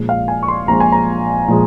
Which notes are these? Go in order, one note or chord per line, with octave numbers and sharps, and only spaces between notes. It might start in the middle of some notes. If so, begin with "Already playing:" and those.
Already playing: A#1 A#2 F3 G#3
F5
G#5
C#6
C6
A#1 A#2 F3 G#3 A#5
G#5
A#5
A#2 F3 G#3